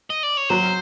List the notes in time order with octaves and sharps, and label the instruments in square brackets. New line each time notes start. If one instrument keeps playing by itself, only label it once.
[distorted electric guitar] D#5
D5
C#5
[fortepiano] F#3 [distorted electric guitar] C5